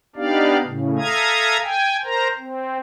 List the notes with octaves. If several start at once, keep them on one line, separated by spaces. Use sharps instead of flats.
B3 D4 D#4 G4 D5 F5
A2 C#3
A4 E5 F5 A#5 D#6 G#6
G5 G#5
A#4 C5 A#5
C4